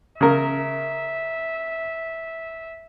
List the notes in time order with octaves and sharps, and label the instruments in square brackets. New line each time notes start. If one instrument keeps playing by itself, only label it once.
[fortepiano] C#3 A#4 [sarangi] E5